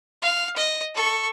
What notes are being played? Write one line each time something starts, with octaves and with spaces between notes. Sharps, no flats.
F5
D#5
A4 C#6